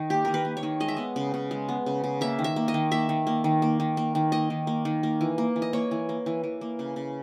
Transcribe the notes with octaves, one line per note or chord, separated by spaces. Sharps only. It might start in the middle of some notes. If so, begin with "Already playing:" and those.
Already playing: D#3 D#4
A#3 G4
D#3 A#4
B4
A#3
C#5
D#3
G#3 D#5
E5
B3 D#5
C#3
C#3
G#3
B3
C#3
C#3
A#3 E5
D#3
E5
A#3
D#5
D#3
A#3 E5
D#3
A#3
D#3
A#3
D#3
A#3
D#3
A#3 D#5
D#3
A#3
D#3
A#3
E3
A#3
E3
D#5
A#3 C#5
E3
A#3
E3
E3
A#3
C#3
C#3